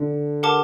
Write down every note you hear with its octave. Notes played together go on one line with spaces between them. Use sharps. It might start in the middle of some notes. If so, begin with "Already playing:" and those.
Already playing: D3
G4 A#4 F#5 A5 D6